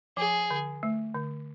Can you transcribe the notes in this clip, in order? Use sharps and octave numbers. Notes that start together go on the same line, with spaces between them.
F3 G#4
D3
A3
D3